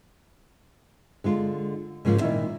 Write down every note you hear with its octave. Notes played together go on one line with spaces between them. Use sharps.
D3 G#3 F4
G#2 C#3 F3 A#3 F4
A#2 D#3 E4 E5